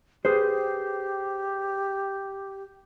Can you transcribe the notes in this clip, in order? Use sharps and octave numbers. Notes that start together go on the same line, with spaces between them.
G4 G#4 B4 C5